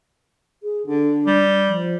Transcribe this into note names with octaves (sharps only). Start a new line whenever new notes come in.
G#4
D3 D4
G3
F3